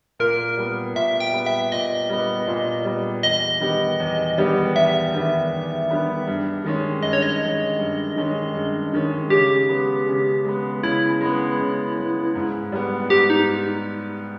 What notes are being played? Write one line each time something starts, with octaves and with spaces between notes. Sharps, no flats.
A#2 A#4
G3 B3
A#2 E5
G5
G3 B3
E5
A#2 D#5
G3 B3
A#2
G3 B3
E2 D#5
D#3 G3 B3 G4
E2
D#3 G3 B3 G4
E2 E5
D#3 G3 B3 G4
E2
D#3 G3 B3 G4
G2
D#3 G#3 C#4
G2 D#5
C#5
D#5
D#3 G#3 C#4
G2
D#3 G#3 C#4
G2
D#3 G#3 C#4
C#3 G4
G#3 B3
C#3
G#3 B3
C#3 E4
G#3 B3
C#3
G#3 B3
G#2
G3 B3
G#2 G4
D#4